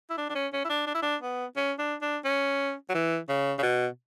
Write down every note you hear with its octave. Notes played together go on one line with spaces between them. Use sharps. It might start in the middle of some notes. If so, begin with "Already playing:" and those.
E4
D4
D4
C#4
C#4
E4
D4
D4
E4
D4
B3
C#4
D4
D4
C#4
F#3
E3
C#3
C#3
B2